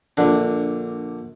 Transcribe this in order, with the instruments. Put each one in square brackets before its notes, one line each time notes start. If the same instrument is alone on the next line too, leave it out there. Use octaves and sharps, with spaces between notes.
[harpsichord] A#1 D3 D4